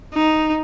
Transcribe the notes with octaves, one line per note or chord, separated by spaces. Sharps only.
D#4